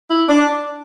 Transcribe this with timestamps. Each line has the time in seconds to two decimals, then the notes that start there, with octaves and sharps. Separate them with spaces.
0.09 E4
0.29 D4